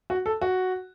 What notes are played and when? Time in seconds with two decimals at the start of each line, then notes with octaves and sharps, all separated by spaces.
0.10 F#4
0.26 A4
0.41 F#4